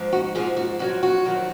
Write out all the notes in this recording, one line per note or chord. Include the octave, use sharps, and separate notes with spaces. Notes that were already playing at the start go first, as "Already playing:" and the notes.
Already playing: G#2 F3
F#4
G#2 F3 G#4
F#4
F2 D#3 F#3 F#4
F#4
F2 D#3 F#3